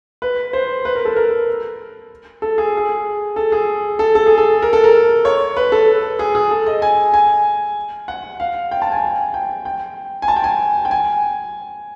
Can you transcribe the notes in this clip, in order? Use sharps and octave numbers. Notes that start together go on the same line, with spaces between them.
B4
C5
B4
A#4
A4
A#4
A4
G#4
G#4
A4
G#4
A4
A4
G#4
A4
A#4
A4
A#4
C#5
B4
A4
G#4
G#4
A4
D#5
G#5
G#5
F#5
F5
G5
A5
G#5
G5
G5
G#5
A5
G5
G#5
G5
G#5